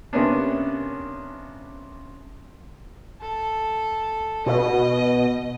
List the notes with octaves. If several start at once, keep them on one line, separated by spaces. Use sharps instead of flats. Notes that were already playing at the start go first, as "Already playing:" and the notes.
C3 A#3 B3 C#4 D4
A4
B2 D#5